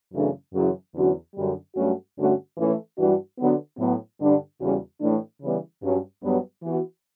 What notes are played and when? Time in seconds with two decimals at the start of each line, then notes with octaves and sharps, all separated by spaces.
0.13 F#2 C#3 E3 A3 D4
0.54 F#2 C#3 E3
0.95 E2 D3 F#3 C#4 F#4
1.35 F#2 D3 G3
1.76 G2 F#3 A3 C#4 F#4
2.16 G2 D3 A3 C#4 F#4
2.57 A2 E3 A3 C#4 E4
2.97 G2 E3 G3 D4 F#4
3.38 D3 F#3 B3
3.79 A2 F#3 B3
4.20 G2 D3 G3 D4
4.60 E2 C#3 G3 C#4 F#4
5.01 A2 E3 A3 D4
5.41 C#3 E3 G3 B3
5.82 G2 F#3 C#4
6.22 G2 F#3 B3
6.63 E3 B3 F#4